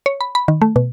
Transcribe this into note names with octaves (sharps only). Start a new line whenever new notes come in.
C#5
B5
B5
D#3
A3
B2